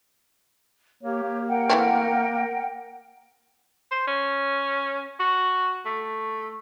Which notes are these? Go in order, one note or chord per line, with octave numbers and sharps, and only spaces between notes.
A#3 G4 C#5
A#3
A#4 F#5 G5
E3 A3 C4
C5
C#4
F#4
A3